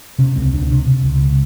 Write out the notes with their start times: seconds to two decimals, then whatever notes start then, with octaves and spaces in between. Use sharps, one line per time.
0.19 C3 C#4
0.36 C#2 C4
0.53 C#2 D4
0.70 C3 D4
0.86 C3
1.04 C#2